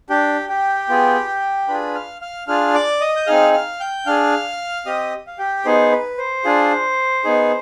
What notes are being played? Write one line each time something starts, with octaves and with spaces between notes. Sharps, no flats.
D4 G4 G5
G4 G5
B3 F4 G#4
D4 F4 G#4 B4 B5
F5 F6
F5 F6
D4 F4 G#4 F5 F6
D5 D6
D#5 D#6
G6
C4 D#4 G#4 F5 F6
F5 F6
G5 G6
D4 G#4 F5 F6
C4 G4 D#5 D#6
F5
G4 G5
B3 D#4 G#4 C5
B4
C5
D4 F4 G#4
B3 D#4 G#4